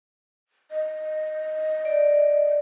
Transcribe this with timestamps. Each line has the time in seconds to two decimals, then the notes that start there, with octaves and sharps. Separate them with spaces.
0.71 D#5
1.85 D5